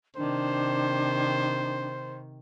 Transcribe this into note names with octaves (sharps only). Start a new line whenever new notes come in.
C3 D#3 D4 C5